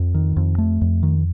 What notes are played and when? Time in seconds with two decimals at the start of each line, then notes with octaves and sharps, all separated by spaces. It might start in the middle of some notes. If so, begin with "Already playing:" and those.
Already playing: F2
0.14 D#3
0.36 F2
0.58 A3
0.81 F2
1.03 D#3